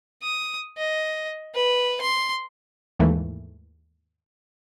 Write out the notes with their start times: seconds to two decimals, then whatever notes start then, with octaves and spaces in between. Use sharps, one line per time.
0.23 D#6
0.78 D#5
1.55 B4
2.01 C6
2.99 D#2 G#2 E3 A3 A#3